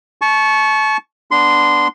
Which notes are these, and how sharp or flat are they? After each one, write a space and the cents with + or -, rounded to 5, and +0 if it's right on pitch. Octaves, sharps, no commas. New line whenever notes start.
A5 -30 C#6 +0
B3 -15 D4 +0 C6 -15